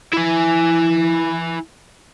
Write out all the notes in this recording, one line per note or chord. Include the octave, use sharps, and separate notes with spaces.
E4 G#5